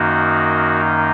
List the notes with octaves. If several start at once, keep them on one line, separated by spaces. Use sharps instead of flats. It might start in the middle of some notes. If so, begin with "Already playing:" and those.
Already playing: F#2 D#3 A#3 D#4 F#4